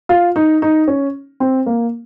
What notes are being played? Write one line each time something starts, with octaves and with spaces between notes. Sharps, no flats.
F4
D#4
D#4
C#4
C4
A#3